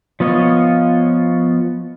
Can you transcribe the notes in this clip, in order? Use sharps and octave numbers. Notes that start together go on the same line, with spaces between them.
F3 B3 F4 C#5 D#5